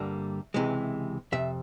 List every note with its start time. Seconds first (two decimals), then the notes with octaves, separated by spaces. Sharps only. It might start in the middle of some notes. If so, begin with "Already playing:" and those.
Already playing: G2 D3 G3 A#3 E5
0.54 C#2 C3 E3 G#3
1.32 F2 C3 E5